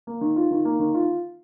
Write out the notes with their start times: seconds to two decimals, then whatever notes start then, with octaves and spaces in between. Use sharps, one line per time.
0.07 A#3
0.21 D#3
0.36 F4
0.51 D#3
0.65 A#3
0.80 D#3
0.94 F4